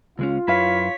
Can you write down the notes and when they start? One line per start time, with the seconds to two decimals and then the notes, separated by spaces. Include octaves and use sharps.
0.19 C#2 G#3 C#4 F4
0.48 F#2 E4 B4 C#5 F5 B5 B6